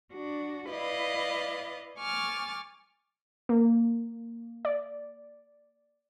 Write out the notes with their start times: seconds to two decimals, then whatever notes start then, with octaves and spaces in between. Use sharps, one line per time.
0.14 D4 F#4
0.69 E4 B4 D5 D#5 F5
1.97 G#5 C#6 D6 F6 A6
3.49 A#3
4.65 D5